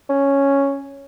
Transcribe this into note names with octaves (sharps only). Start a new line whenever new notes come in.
C#4